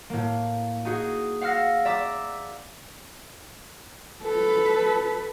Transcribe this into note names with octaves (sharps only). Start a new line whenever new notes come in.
A2 A#3
D#4 F#4 G#4
F5 F#5 E6 F6 A#6
D5 E5 A#5 D6 E6
A4 B4